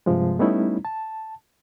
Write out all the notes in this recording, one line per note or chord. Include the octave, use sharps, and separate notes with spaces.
G2 C3 F3 G#3
G3 A3 B3 C#4 D#4 E4
A5